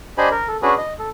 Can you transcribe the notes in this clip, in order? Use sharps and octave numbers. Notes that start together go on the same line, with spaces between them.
D4 G4 C5 D#5 G#5 B5
A#4
A4
C#4 D4 F#4 G#4 B4
D#5
A4